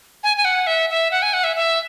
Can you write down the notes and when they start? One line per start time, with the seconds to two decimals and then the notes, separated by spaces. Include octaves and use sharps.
0.23 G#5
0.37 G#5
0.45 F#5
0.67 E5
0.90 E5
1.11 F#5
1.22 G#5
1.33 F#5
1.44 E5
1.56 E5